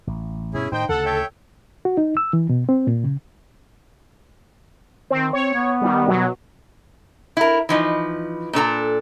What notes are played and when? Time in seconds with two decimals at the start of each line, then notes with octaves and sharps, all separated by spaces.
0.07 A1
0.54 G2 B2 C#4 E4 G#4
0.72 A2 D#3 D#4 C5 G5
0.89 D2 C#3 A4 F#5
1.05 C#5 E5 G5
1.85 F#4
1.97 D#4
2.17 E6
2.33 E3
2.49 B2
2.69 C4
2.87 A#2
3.04 C#3
5.10 D#3 C4
5.33 C4 C#5
5.54 B3
5.81 D#3 G3
6.08 B2 F#3
7.37 E4 A#4
7.69 E3 F3 D#4
8.53 A#2 D4 A4 A#5